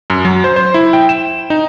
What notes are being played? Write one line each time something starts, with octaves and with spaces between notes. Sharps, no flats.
F#2
F#3
C5
C5
E4
G5
E7
D#4